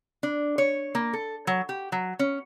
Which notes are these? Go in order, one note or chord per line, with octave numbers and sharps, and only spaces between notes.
D4
C#5
A#3
A4
F#3
G4
F#3
C#4